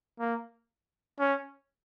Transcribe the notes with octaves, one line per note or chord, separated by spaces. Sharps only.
A#3
C#4